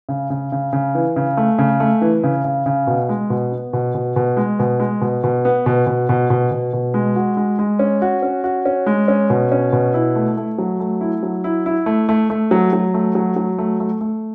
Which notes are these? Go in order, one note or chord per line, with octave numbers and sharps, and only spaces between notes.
C#3
C#3
C#3
C#3
E3
C#3
A3
C#3
A3
E3
C#3
C#3
C#3
B2
G#3
B2
B3
B2
B2
B2
G#3
B2
G#3
B2
B2
B3
B2
B2
B2
B2
B2
B2
G#3
F#4
G#3
G#3
C#4
F#4
C#4
F#4
C#4
G#3
C#4
B2
C#4
B2
E4
A3
A3
F#3
A3
E4
F#3
E4
E4
A3
A3
A3
F#3
F#3
A3
F#3
F#3
A3
A3
A3